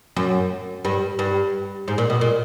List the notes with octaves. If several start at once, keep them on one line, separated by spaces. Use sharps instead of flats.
F#2
G2
G2
G#2
A#2
B2
A#2